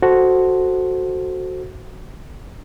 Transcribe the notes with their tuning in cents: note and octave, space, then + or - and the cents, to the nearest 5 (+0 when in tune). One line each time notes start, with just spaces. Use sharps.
F#4 +0 A4 +0 C5 +0